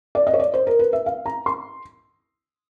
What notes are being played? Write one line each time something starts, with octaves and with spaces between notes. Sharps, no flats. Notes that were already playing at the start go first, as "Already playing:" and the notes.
D5
D#5
C#5
D5
C5
A#4
B4
E5
F5
A#5
C6